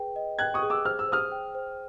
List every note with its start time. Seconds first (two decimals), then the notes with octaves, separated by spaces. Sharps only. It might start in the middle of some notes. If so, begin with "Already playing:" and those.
Already playing: G#4 B4 G5
0.16 D#5
0.39 G5 F#6 G#6
0.54 C#6 D#6
0.62 G#4
0.70 D6 E6
0.85 C5 F6
0.99 E6
1.09 C5 D#6 F6
1.32 G5
1.55 C5